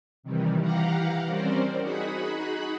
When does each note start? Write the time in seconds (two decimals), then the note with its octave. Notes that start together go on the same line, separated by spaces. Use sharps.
0.23 C3 D#3 E3 G3
0.61 E3 G4 F5 F#5 A#5
1.25 G3 C4 C#4 A#4 C5 D5
1.82 D#4 F#4 G#4 F#5 B5